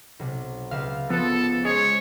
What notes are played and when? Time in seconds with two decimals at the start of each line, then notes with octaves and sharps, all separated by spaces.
0.19 B1 C3
0.71 C#2 E5 F5 E7
1.10 F3 B3 A4
1.65 G#3 C#4 C5 C#5